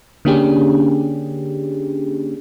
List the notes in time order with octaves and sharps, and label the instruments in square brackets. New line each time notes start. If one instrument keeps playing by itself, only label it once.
[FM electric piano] D3 A#3 C#4 D4 G4 G#4